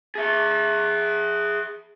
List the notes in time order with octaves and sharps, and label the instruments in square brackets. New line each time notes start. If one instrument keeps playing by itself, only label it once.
[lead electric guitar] G#4 E5